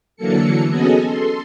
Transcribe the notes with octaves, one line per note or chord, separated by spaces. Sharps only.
D3 E3 F#3 A#3 A4 C#7
B3 C#4 F#4 G#4 A4 D#5
A4 C6